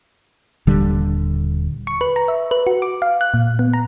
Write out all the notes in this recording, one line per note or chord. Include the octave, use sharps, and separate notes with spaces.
D#1 D3 G3
C#6
B4
A#5
E5
B4
F#4
D6
F5
F#6
A#2
B3
A#5